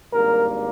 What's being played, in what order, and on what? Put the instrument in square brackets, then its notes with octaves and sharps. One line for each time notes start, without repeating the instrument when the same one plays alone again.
[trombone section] G#1 G2 G3 A#3 A#4